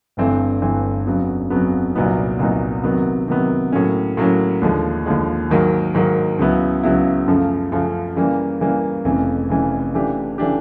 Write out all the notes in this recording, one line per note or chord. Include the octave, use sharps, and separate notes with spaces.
G1 G2 E3 A3 C4
G1 G2 E3 A3 C4
F2 C#3 F#3 B3
F2 C#3 F#3 B3
C2 A#2 F#3 B3 D#4
C2 A#2 F#3 B3 D#4
C3 D#3 F#3 B3
C3 D#3 F#3 B3
A2 F#3 A#3 C#4
A2 F#3 A#3 C#4
D#2 D3 F3 G#3
D#2 D3 F3 G#3
G#2 D#3 F#3 A#3
G#2 D#3 F#3 A#3
C#2 C#3 F#3 B3 E4
C#2 C#3 F#3 B3 E4
F#2 C#3 F3 A3
F#2 C#3 F3 A3
C#3 E3 G3 A#3
C#3 E3 G3 A#3
F1 F2 C#3 E3
F1 F2 C#3 E3
C#3 E3 A3 D4 G4
C#3 E3 A3 D4 G4